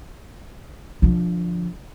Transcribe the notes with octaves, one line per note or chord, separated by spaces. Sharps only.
D3 F3